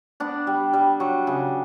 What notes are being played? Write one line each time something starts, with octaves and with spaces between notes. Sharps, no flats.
B3 D4
G3
G3
F#3
C#3